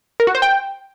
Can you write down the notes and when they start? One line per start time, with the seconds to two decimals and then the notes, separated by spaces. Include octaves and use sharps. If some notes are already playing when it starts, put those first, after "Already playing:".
0.20 A#4
0.27 F#4
0.35 C5
0.42 G5